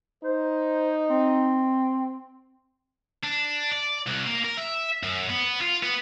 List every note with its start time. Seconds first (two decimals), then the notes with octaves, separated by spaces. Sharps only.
0.24 D#4 C5
1.10 C4
3.23 D4
3.72 D5
4.06 C2
4.26 A#3
4.44 A#4
4.57 E5
5.03 F#2
5.30 B3
5.61 F4
5.83 B3